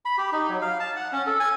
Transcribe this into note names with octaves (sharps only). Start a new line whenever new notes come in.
B5
G4
D#4
F#3
F5
A5
F#5
C#4
A4
G#5